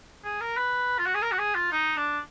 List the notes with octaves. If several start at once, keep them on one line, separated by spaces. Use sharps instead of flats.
G#4
A#4
B4
F4
F#4
G#4
A#4
F#4
G#4
F4
D#4
D4